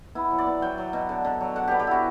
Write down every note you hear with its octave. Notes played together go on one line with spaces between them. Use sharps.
B3 E4
F#3
D5
B3
F#3 G5
F#3
B2
D3
D3
F#3
D3 F#5
B3 G4
G4
E4 F#4